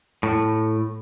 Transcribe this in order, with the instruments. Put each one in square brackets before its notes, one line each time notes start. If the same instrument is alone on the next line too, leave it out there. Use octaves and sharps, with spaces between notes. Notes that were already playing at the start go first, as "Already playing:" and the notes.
[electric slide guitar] A2